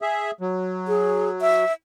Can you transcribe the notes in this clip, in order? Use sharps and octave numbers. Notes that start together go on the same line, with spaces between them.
G#4 E5
F#3
G#4
E5